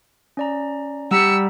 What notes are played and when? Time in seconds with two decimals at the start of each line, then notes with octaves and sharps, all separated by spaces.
0.37 C#4 D5 A#5
1.11 G3 F#5 A#5 E6 B6 C#7